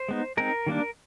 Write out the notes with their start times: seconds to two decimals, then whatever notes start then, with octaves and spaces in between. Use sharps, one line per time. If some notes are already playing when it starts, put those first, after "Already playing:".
Already playing: C5
0.09 G#3 B3 D#4
0.37 G#3 C4 D#4 A#4
0.67 D#3 G3 A#3 D4